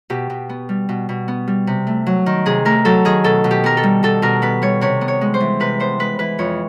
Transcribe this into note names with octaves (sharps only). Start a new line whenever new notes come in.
B2 G4
B2
B3
G3
B2
B2
B3
G3
C3
A3
F#3
D#3
C3 G#4
A3 A#4
F#3 A4
D#3 G#4
B2 A4
B2
G4
B3 A#4
A4
G3
B2 A4
B2 A#4
B3 B4
G3 C#5
C3 C#5
B3
C#5
G#3
C5
E3
C3 B4
B3 C5
G#3 B4
E3 B4
F2 C#5